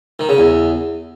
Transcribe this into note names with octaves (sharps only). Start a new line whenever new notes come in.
D#3
C#3
E2